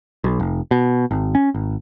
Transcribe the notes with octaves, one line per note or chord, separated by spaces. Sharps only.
B1
F1
B2
G#1
C#4
G#1